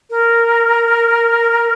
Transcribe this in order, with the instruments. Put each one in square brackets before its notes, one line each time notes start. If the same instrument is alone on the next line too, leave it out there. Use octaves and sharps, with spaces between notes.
[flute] A#4